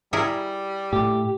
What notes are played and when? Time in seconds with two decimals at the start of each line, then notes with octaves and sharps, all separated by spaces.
0.13 G3 E4 G#4 A#4
0.93 A2 G4